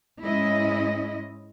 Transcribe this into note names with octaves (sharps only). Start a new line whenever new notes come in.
G#2 G#3 C#4 E4 D#5